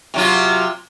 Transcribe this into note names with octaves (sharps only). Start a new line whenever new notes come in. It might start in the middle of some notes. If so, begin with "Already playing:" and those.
C3 F#3 F4